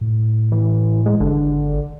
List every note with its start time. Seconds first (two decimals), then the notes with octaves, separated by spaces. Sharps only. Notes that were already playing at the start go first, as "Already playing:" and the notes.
0.01 A2
0.52 E3
1.06 G#3
1.20 G#1 D3